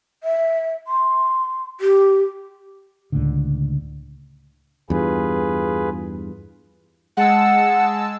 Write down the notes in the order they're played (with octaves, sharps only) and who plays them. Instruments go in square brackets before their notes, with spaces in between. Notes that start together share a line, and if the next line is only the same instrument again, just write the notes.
[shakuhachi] E5
C6
G4
[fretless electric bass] C#2 A2 D3
[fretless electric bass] E2 G2 [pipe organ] F4 G#4 B4
[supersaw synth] G#3 A5 E6 [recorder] F#5